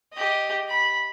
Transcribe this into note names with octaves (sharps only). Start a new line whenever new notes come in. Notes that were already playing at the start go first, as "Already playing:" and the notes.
G4 D#5
B5